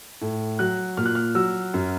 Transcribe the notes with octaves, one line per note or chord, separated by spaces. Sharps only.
A2
F#3 F#6
A#2 F6
F#6
F6
F#3 E6
F#2